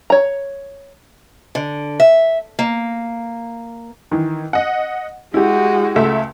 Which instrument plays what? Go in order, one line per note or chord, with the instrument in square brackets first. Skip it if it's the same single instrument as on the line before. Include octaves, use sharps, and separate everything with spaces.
[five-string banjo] C#5 A#5
[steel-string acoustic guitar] D3
E5
A#3
[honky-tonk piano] D#3 E3
D#5 F#5
[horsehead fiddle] G#3 F#4 [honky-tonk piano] E4 G4
[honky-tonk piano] C#2 A3 E5